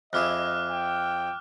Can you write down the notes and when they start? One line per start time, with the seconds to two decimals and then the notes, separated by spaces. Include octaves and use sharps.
0.13 F2 E4 G#4 D#5 D6 F6 F#6
0.71 G5